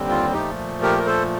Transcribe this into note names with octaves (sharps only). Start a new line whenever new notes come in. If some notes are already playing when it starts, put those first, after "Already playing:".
Already playing: D#2 D3 G3 C4
F4
A#2 F3 A3 D#4 G4
G4 A#4
A#4
A4 C5